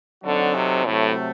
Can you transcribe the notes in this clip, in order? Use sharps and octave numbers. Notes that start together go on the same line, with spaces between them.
D3 F#3 C4 D#4 F#4 A4
C3
A2 C3 F#3 A3